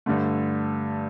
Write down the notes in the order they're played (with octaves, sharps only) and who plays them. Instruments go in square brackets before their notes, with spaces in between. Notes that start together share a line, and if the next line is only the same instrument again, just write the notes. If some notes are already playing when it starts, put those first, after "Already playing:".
[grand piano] G2 D3 A3